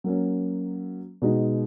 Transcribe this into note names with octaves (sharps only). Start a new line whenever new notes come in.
F#3 A#3 C#4
B2 G#3 D#4